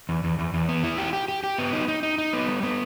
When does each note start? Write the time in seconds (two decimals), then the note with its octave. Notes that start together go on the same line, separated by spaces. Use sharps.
0.09 E2
0.24 E2
0.39 E2
0.54 E2
0.68 B3
0.84 E4
0.98 G4
1.13 G4
1.28 G4
1.44 G4
1.58 B3
1.73 D#4
1.88 D#4
2.03 D#4
2.18 D#4
2.33 B3
2.48 G3
2.63 B3